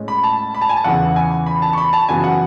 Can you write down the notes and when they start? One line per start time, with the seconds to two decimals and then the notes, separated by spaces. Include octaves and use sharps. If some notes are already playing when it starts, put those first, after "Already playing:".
Already playing: A2 G#3 C#4
0.08 B5
0.24 A5
0.54 B5
0.61 A5
0.69 G#5
0.77 A5
0.84 E2 C#3 E3 B3 F#5
1.16 G#5
1.46 B5
1.62 A5
1.73 C#6
1.78 B5
1.93 A5
2.08 F#2 C#3 E3 B3 G#5
2.24 F#5